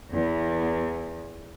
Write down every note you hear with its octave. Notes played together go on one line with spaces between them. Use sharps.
E2